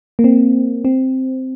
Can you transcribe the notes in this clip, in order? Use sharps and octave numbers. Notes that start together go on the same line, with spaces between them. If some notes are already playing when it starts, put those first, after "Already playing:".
A#3
C4
C4